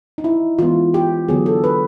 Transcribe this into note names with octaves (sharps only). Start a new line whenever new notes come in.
D#4
E4
E3 G#3 B3 F4
G4
D3 F#3 B3 G#4
A4
B4